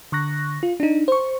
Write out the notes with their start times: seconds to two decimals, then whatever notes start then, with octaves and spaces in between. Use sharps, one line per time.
0.12 D3 C#6 F#6 A#6
0.63 F4
0.80 D4 D#4
1.08 C5 C#6